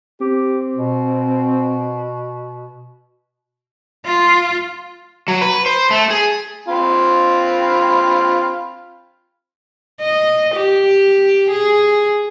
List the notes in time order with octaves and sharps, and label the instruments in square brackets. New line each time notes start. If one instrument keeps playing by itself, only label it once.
[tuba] C4 [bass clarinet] G4
[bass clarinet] B2
[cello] F4
[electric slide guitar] F#3
B4
C5
A3
G#4
[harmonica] C4 F4 B5
[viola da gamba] D#5
G4
G#4